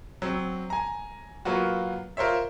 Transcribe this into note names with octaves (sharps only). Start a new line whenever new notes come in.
F#3 C4
G#5 A#5
F#3 A#3 B3 F4 F#4
F4 A#4 C5 C#5 E5